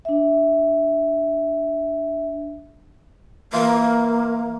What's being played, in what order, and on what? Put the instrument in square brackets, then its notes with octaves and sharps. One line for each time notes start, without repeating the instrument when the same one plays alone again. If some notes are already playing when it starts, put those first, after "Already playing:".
[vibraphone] D4 E5
[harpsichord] E3 F4 [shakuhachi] A#3